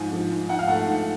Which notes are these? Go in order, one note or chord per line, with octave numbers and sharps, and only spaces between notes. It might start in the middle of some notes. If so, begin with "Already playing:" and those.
Already playing: G#2 F3 G#5
F3
G#2
G#2 F#5
F5
A3 F#5
G#2